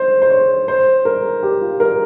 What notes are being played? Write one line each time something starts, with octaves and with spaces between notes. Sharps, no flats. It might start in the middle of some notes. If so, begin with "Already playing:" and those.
Already playing: C5
C5
C#5
C5
A#4
G4
F4
A#4